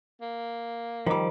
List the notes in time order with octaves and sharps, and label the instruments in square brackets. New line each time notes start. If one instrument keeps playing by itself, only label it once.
[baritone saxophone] A#3
[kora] D#3 G3 [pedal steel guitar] F3 D6